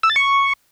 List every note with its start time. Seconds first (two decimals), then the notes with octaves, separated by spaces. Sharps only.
0.03 E6
0.10 A6
0.16 C#6